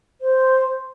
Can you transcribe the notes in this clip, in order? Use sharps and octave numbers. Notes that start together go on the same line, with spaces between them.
C5